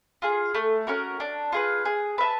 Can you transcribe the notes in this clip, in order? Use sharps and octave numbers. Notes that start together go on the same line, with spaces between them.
F4 G#4
A3
C#4 F#4 A#4
D4
F4 G#4 B4
G#4
B4 E5 A5